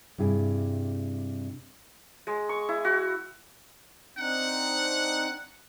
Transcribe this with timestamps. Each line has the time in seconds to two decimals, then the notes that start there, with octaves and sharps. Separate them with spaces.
0.18 G2 C3 E4 G#4
2.27 G#3
2.49 C#6
2.69 E4
2.85 F#4
4.18 C4 D4 D#4 F#5